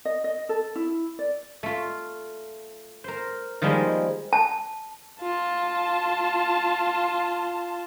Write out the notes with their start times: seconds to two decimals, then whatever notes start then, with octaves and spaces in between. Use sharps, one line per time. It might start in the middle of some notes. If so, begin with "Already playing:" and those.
0.05 D#5
0.24 D#5
0.49 A4
0.76 E4
1.19 D5
1.63 A3 F4
3.04 A#4 C5
3.62 D#3 F3 G3 G#3 A#3
4.33 A5
5.21 F4 A5